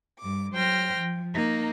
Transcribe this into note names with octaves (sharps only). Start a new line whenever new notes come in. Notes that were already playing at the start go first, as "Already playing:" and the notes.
G2 D6
F#3 C5 G5 F6 A#6
F3
A#3 D#4